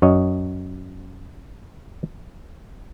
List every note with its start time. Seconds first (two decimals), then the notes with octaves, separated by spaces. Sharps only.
0.02 F#2 C#5 D#5